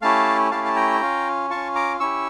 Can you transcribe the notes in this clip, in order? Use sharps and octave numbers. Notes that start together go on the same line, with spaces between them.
A3 C#4 E4 G4 F5 A5
A3 C#4 E4 G4 F5 A5
A5
G5 A#5
C#4 F4
C#4 F4 A5 C#6
A#5 D6
C#4 E4 G4 C#6 E6